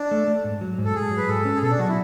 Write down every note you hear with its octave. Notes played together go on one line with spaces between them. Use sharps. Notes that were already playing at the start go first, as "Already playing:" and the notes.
Already playing: D4
A3
A3
G#2
F#3
G#2
A4
G#2 G#4
F#3
B4
G#2 A4
C#4
G#4
B2 A4
D4
F#3 F#4
E4